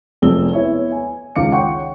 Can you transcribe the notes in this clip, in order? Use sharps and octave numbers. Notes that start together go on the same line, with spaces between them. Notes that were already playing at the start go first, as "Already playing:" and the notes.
F1 F2 G#4 E6 G7
B3 E4 C#5
G#5
C#2 D#3 F5 D6 C#7
C#5 F#5 G5 C6 C#6